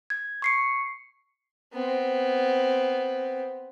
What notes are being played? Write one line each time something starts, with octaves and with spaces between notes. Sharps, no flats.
G#6
C#6 C7 C#7
B3 C4